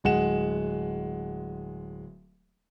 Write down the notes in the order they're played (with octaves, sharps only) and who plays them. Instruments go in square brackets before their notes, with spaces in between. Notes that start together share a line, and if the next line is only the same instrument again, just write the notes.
[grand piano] D1 G#3 F#5 E7